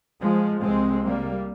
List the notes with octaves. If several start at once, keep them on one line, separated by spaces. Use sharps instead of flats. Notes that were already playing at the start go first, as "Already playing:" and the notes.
F3 G#3
C2 C3 G#3 C4
G3 A#3